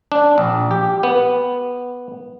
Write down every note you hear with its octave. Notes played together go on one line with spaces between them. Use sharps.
D4
A#1
G4
B3